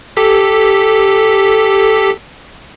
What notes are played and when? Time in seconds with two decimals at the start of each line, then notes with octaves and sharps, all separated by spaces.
0.17 G4 A4 B6